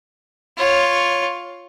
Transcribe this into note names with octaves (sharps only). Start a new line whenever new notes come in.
F4 C#5